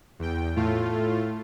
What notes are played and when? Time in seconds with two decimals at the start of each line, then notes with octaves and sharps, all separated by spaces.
0.19 E2 G5
0.56 A2 A3 F4